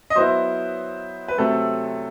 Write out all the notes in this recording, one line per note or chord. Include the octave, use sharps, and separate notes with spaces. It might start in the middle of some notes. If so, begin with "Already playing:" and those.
D#5
F#3 B3 E4 C5
B4
C3 F#3 A3 C4 A4